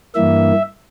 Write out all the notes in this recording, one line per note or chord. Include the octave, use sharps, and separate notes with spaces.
G2 E3 A#3 E5